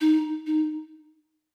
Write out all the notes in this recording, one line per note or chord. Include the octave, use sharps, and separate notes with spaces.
D#4
D#4